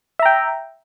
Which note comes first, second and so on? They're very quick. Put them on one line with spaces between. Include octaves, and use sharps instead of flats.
E5 A#5 G5